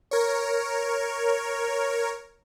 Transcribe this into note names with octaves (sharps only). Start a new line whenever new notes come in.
A#4 C#5